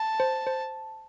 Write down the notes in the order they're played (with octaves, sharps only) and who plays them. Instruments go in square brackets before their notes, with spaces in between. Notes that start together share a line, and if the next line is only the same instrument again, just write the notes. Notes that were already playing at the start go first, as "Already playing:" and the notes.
Already playing: [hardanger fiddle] A5
[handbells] C5
C5